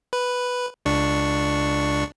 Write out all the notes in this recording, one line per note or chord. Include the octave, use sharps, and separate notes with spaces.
B4
C#2 D4 C#6